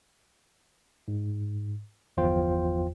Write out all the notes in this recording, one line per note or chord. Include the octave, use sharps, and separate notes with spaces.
G#2
G1 E2 F3 F4 C5 G5